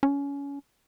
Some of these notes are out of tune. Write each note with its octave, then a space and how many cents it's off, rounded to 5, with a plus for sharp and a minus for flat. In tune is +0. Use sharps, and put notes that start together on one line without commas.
C#4 +25